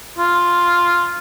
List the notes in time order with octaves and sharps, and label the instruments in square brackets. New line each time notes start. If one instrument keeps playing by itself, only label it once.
[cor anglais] F4